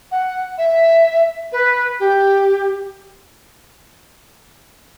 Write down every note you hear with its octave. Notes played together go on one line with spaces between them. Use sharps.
F#5
E5
B4
G4